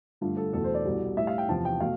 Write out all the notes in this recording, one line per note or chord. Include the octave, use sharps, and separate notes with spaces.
G2 D3 A3 F4
A4
E2 B2 A3 A4
C5
D5
C2 B2 G3
A2 G3 E5
F5
G5
E2 C3 F3 A5
G5
B2 A3 F5